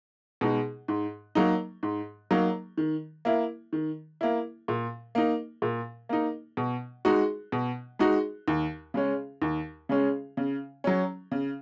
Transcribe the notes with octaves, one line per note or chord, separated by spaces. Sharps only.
B2 G#3 D#4
G#2
F#3 A#3 D#4
G#2
F#3 A#3 D#4
D#3
A#3 E4
D#3
A#3 E4
A#2
A#3 D#4
A#2
A#3 D#4
B2
G#3 D#4 F#4
B2
G#3 D#4 F#4
D#2
C#3 G#3 C#4
D#2
C#3 G#3 C#4
C#3
F#3 C#4
C#3